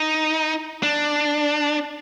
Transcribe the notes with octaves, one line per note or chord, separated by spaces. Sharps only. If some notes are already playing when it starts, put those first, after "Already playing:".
Already playing: D#4
D4